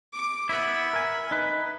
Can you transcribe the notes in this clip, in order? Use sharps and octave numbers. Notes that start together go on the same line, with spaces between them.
D6
B3 E4 E5 B5
A#4 G#5
D#4 B4